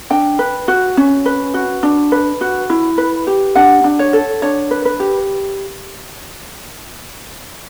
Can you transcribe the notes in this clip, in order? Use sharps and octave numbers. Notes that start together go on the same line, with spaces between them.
D4 G5
B4
F#4
C#4
B4
F#4
D4
B4
F#4
E4
B4
G4
D4 F#5
D4
C#5
A4
D4 C#5
B4
B4
G4